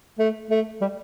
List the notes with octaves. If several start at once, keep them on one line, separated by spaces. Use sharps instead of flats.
A3
A3
G3